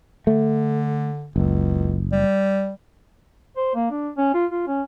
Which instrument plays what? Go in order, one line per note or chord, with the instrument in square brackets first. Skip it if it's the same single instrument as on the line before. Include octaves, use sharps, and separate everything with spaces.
[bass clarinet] D3 [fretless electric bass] A3
[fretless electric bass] F#1 [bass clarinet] C#2
[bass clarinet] G3
[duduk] C5
A#3
D4
C#4
F4
F4
C#4